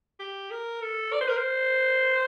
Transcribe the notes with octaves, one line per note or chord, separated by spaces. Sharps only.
G4
A#4
A4
D5
C5
A#4
C5